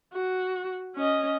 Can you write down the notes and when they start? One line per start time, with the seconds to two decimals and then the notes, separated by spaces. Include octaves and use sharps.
0.13 F#4
0.96 C#4 D#5